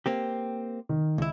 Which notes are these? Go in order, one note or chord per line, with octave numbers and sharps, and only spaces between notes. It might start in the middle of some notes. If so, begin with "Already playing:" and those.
A#3 C4 G4
D#3
C#2 E4